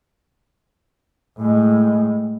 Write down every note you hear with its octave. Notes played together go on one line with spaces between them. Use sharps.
A2 G#3